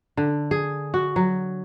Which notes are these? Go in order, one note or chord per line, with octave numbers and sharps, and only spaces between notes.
D3
G#4
F#4
F#3